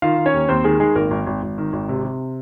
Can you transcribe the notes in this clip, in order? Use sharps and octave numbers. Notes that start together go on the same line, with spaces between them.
D#3 F4 F5
D#3
C#4 C#5
D#2
D#2 C4 C5
D#3 G#3 G#4
D#3 G#3 G#4
G#1 A#3 A#4
G#1
G#1
G#1
D#3
G#1
C3
C3